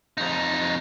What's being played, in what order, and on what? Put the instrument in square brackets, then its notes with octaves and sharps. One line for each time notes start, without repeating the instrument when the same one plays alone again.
[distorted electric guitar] F2 D#4